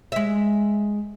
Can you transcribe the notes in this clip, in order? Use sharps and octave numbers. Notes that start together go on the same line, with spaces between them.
G#3 E5